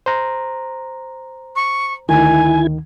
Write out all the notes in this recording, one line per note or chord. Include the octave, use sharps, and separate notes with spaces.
C5 A#5
C#6
D2 D#3 E4 G#5 G#6